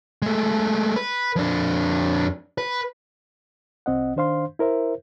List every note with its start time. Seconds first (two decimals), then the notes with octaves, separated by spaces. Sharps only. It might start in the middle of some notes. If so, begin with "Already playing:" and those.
0.22 G#3 A3
0.96 B4
1.36 F2 D4
2.58 B4
3.86 C2 C4 D#5 F#5
4.16 D#3 D4 C5 F5 C6
4.59 E4 A#4 C5 E5